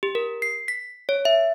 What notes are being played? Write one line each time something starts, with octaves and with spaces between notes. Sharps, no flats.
G4
A#4
C7
B6
C#5
E5